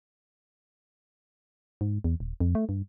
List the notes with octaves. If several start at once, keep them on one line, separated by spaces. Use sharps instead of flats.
G#2
E2
D#1
F2
A3
G2